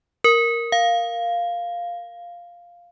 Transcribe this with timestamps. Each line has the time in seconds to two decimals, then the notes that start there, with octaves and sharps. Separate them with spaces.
0.24 A#4
0.72 F5